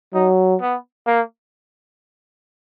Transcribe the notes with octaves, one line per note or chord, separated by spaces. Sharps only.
F#3 D#4
B3
A#3